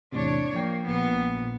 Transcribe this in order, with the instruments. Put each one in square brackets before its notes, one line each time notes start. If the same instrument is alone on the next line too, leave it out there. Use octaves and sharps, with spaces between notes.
[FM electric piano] E2 A2 C3 [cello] D4 C#5
[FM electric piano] F3 G5 C7 [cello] A#3
[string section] A#1 [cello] B3